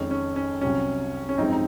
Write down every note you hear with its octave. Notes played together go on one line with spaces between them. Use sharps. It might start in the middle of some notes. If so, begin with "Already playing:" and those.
Already playing: F2 D#3 G#3 C#4
C#4
C#4
C2 C3 F#3 C#4
C#4
G#1 F#2 F3 G#3 C4 D#4
D#4